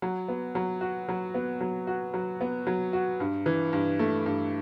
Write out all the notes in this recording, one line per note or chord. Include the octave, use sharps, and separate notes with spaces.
F#3
B3
F#3
F#4
F#3
B3
F#3
F#4
F#3
B3
F#3
F#4
G2
E3
G2
A3
G2